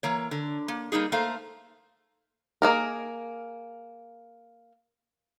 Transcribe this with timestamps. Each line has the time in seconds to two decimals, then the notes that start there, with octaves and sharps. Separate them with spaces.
0.03 E3 A#3 C#5
0.31 D3
0.68 A#3
0.92 G3 A#3 D#4 G#4
1.12 A3 A#3 C5 F5
2.62 A#3 G#4 A#4